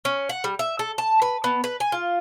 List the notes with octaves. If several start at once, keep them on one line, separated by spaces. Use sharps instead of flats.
C#4
F#5
G3
E5
A4
A5
B4
B3
B4
G#5
F4